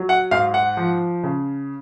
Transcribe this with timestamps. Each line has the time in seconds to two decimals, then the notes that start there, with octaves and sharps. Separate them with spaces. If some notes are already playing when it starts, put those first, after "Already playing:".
Already playing: F#3
0.09 F#5
0.31 G#2 F5
0.54 F#5
0.77 F3
1.23 C#3